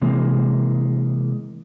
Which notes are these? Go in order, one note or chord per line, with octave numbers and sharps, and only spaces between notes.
C3 E3 G#3 A#3